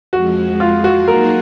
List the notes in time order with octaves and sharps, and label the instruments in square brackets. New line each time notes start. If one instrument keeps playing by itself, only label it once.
[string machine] F2 F3 G#3 [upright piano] F#4
[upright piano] F4
F#4
[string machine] F#3 A#3 D#4 G#4 [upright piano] A#4